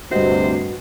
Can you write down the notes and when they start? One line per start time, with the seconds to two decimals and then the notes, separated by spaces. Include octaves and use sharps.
0.11 D2 G2 C3 F#4 C5 D#5